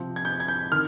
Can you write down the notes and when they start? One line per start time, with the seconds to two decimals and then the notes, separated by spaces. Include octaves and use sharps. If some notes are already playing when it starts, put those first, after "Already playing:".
Already playing: C3 F3 C4
0.16 G#6
0.25 G6
0.40 G#6
0.48 G6
0.71 D#3 F6